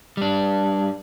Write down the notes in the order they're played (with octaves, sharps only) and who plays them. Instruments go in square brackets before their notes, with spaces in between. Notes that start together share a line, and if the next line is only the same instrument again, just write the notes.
[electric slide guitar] G3 D4